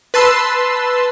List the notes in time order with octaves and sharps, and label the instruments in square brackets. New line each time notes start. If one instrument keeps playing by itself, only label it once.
[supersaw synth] B4 A5 C6 E6